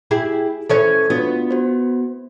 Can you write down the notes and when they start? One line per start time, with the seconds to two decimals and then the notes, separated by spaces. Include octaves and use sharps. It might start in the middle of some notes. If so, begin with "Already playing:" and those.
0.11 E4 G4 G#4
0.70 E3 C#4 A4 C5 C#5 G#6
1.10 B3 D4 F4 F#4
1.51 F#4 C5